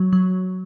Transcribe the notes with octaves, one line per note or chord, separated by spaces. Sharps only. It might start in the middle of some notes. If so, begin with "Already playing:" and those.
Already playing: F#3
F#3